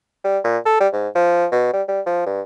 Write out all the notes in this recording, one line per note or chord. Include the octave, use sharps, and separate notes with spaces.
G3
A#2
A4
G3
G#2
F3
B2
G3
G3
F3
G2